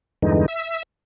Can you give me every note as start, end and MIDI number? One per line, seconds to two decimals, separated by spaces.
0.22 0.46 40
0.22 0.46 43
0.22 0.46 50
0.22 0.46 52
0.22 0.46 56
0.22 0.46 63
0.48 0.83 76
0.48 0.83 88